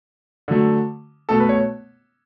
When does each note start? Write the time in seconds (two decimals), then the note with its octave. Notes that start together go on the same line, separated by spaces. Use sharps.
0.48 D3 F#3 A3
1.29 B2 A3 A4
1.40 B4
1.49 C#5